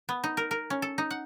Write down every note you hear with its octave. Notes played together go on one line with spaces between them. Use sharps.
B3
D#4
A#4
A#4
C#4
A4
D#4
F#5